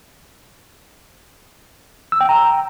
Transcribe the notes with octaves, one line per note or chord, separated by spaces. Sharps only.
E6
G5
A#5